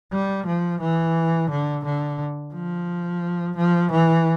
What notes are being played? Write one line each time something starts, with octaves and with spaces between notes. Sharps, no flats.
G3
F3
E3
D3
D3
F3
F3
E3